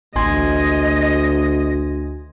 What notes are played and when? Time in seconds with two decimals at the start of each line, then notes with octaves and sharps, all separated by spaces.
0.16 A1 D2 D#5 G#5 C6 G#6